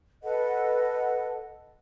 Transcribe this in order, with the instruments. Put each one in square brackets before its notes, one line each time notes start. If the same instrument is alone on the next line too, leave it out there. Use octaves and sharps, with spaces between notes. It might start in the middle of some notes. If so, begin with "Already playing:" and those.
[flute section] A4 B4 D#5 F#5